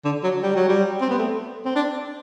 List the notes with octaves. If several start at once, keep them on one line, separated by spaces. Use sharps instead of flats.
D3
F#3
G3
F#3
G3
C4
B3
A3
C4
D4